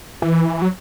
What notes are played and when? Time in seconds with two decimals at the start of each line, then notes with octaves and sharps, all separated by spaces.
0.22 E3
0.62 F#3